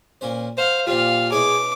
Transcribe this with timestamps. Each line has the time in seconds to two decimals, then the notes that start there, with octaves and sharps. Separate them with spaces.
0.21 A#2 C#4 C5
0.58 C5 F5 F#5
0.87 A#2 F3 G3 F4 F5
1.32 B2 E4 G#4 C#5 D6